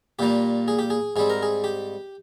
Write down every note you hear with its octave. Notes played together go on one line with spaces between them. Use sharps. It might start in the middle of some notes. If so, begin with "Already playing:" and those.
A#2 G3 A#3 G4
G#4
G4
G#4
G#2 G3 C4 G#4
A#4
G#4
G4